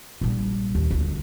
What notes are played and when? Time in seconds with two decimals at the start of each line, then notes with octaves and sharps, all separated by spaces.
0.21 A#1 G3
0.75 D#2
0.91 D2 D3